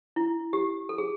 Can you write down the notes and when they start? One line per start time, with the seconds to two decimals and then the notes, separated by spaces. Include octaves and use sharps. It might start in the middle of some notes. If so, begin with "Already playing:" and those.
0.16 E4
0.53 G4
0.89 A4
0.98 G#4